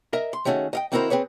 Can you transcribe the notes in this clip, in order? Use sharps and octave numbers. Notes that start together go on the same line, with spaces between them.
A#4 D#5 E5
C6
D#3 A3 C#4 F#4 G#4
D#5 F5 G5
D#3 C4 E4 F#4 A#4 C5
C4 G#4 B4 C#5